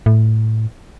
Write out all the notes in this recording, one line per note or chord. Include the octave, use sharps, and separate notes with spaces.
A2